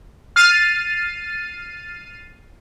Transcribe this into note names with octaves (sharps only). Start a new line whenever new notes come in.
F6 A6 C7 D#7